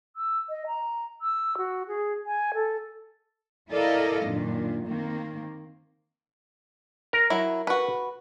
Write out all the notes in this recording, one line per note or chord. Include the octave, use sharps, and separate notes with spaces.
E6
D#5
A#5
E6
F#4
G#4
G#5
A4
E4 A4 A#4 D5 D#5 F5
F#2 A#2 D#3 D4
D#3 A#3 C4
A#4
F#3 E4
F#4 B4